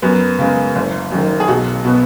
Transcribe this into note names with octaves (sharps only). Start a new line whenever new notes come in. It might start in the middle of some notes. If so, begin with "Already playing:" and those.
F#2 B3
C#3 G#3 B3
F#1
F#2 D#3
G#4
B1 F#4
B2 B3